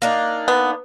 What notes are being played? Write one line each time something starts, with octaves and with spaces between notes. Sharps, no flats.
A#3 D4 D#4
B3